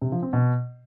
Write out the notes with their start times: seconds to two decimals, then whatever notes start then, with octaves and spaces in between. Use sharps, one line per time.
0.02 C3
0.12 F3
0.23 C4
0.33 B2